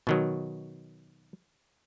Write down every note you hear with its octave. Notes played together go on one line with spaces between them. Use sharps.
B2 D#3 F#3